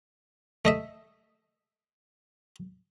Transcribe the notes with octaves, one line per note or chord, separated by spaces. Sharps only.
A3 D#5 E5